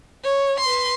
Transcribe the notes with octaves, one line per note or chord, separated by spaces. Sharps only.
C#5
B4 C6